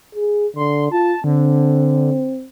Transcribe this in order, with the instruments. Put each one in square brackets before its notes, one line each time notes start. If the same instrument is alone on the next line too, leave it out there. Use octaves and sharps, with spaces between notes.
[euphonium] G#4
[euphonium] D3 [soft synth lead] C6
[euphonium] F4 [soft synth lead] A5
[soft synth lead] D3 [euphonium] C4